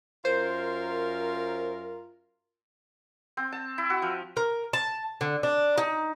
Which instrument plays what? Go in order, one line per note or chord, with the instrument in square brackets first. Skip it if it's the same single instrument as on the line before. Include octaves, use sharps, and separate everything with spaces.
[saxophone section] F#2 F4 A#4 [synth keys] C5
[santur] C4
A5
E4
F#4
F3
[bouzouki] A#4
A5
D3
D4
D#4